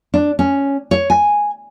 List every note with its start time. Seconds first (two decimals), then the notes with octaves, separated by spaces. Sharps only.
0.14 D4
0.39 C#4
0.91 C#5
1.10 G#5